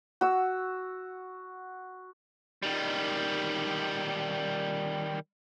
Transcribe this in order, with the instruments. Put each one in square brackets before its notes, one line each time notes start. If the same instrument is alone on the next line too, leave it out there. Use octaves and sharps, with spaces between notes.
[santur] F#4 E6
[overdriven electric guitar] D#3 G3